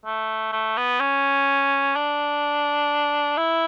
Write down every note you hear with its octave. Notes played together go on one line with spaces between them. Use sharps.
A3
A3
B3
C#4
D4
E4